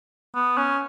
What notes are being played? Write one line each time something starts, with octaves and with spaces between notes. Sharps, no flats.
B3
C#4